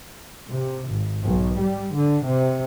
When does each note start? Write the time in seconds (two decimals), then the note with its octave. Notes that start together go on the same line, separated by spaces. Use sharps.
0.50 C3
0.89 G#1
1.24 B1
1.59 G3
1.95 D3
2.25 C3